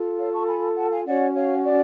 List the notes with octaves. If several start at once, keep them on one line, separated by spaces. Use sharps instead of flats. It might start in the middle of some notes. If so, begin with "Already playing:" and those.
Already playing: F4 A4
C#5 F5
A5 C#6
G#5 B5
F#5 A5
F5 G#5
C#4 F#4 C#5 D5 F#5
C#5 F5
D5